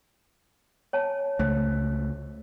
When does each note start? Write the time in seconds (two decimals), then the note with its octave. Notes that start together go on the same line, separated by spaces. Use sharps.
0.93 C#5 G#5 A5
1.39 C#2 A3 C5